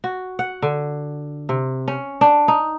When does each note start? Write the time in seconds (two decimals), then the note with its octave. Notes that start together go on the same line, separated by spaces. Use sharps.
0.04 F#4
0.39 F#5
0.62 D3
1.49 C3
1.88 C#4
2.21 D4
2.48 D#4